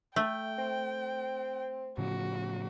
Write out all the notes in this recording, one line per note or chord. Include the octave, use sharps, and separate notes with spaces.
A3 G5
C4
A2 C#3 F3 F#4